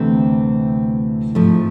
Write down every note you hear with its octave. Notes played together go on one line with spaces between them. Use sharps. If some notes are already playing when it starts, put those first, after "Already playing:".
Already playing: D2 C3 E3 A3 C4
G#2 F3 A3